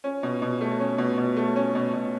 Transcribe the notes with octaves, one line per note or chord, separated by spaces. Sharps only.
C#4
B2
B2
A3
C#4
B2
B2
A3
C#4
B2
B2